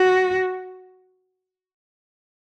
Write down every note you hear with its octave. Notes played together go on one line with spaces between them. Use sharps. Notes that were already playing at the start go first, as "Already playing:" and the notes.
Already playing: F#4